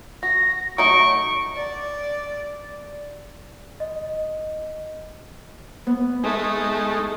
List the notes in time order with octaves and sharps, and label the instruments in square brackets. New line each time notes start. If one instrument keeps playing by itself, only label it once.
[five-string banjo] F#4 [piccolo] A#6
[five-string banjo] F#3 A3 D#4 [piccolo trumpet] C#6 [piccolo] D7
[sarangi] D5
[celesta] D#5
[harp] B3
[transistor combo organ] G#3 D#4 [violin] A3